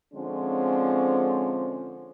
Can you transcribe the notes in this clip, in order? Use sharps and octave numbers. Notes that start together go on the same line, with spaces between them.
D3 F3 G#3 C4 C#4